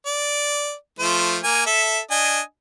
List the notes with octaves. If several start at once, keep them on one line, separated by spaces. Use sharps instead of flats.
D5
F3 A3 C5
A#3 G#5
A4 E5
D4 D#5 G#5